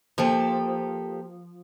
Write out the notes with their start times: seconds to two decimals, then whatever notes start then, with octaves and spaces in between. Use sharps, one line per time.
0.18 F3 A#3 G4 A4